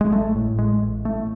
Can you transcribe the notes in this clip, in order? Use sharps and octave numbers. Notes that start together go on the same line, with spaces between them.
G#3
A1 A3
A2
A1 G#3
A1
A2 A3